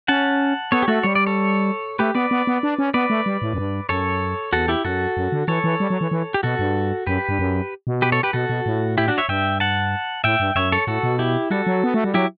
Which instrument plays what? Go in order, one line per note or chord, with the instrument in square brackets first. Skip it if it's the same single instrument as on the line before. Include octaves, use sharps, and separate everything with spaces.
[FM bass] C#4 [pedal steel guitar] F#5 A5
[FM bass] B3 [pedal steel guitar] A4 C#5
[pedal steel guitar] G4
[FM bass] A3 [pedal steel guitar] F#4 A4
[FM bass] G3 [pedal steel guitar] C#5
[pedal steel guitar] D5
A4 C#5
[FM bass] A3 [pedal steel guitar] G4 B4
[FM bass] B3 [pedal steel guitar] B4 D5
[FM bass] B3
B3
D4
C#4
[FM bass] B3 [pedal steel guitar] B4 D5
[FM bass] A3
G3
A2
F#2
G2
[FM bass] F#2 [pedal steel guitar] A4 C#5
[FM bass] E2 [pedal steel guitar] F#4 A4
[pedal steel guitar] E4 G4
[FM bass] F#2 [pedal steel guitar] F#4 A4
[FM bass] F#2
D3
[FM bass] E3 [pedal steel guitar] A4 C#5
[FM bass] E3
G3
F#3
E3
E3
[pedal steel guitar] G4
[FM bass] B2 [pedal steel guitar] F#4 A4
[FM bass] G2
[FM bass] F#2 [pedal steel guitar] G4 B4
[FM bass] G2
F#2
B2
[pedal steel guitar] G4 B4
A4 C#5
G4 B4
[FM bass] B2 [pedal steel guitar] F#4 A4
[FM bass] B2
A2
[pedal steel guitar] E4 G4
D4 F#4
C#5 E5
[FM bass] G2 [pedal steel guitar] E5 G5
[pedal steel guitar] F#5 A5
[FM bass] A2 [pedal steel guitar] E5 G5
[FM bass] G2
[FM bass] F#2 [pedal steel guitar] C#5 E5
[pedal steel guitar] A4 C#5
[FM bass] A2 [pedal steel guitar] F#4 A4
[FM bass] B2
[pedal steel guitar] E4 G4
[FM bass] G3 [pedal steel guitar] F#4 A4
[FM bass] F#3
B3
A3
G3
[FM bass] F#3 [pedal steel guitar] E4 G4